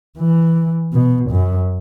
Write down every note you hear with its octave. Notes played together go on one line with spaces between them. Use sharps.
E3
B2
F#2